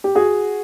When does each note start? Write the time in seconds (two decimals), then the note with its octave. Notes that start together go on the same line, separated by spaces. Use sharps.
0.04 G4
0.15 F#4 G#4